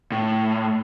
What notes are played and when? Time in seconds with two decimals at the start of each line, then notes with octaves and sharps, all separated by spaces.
0.12 A2